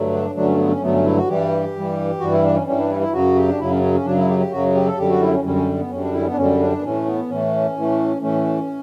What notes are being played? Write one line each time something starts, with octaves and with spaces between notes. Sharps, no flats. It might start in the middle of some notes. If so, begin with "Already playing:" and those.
Already playing: G2 D3 F#3 A3
D4
G2 D3 F#3 A3 D4
C#4
B3
C#4
G2 D3 F#3 A3 B3
C#4
E4
F#4
G2 E3 G3 G4
G2 E3 G3
G2 E3 G3 F#4
E4
D4
C#4
G2 E3 G3 C#4
D4
E4
E4
F#2 C#3 F#3 F#4
G4
D4
F#2 C#3 F#3 E4
C#4
C#4
C#4
F#2 C#3 F#3 D4
E4
G4
G4
F#2 C#3 F#3 F#4
G4
A4
F#2 D3 G3 G4
F#4
E4
C#4
F#2 D3 G3 C#4
C#4
B3
F#2 D3 G3 C#4
D4
E4
C#4
B3
D4
F#2 D3 G3 C#4
D4
B3
A2 E3 A3 C#4
B3
A2 E3 A3 C#4
A2 E3 A3
A2 E3 A3 C#4